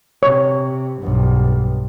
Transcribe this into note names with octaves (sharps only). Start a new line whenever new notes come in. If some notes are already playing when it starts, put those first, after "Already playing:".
C3 C#5
B1 G2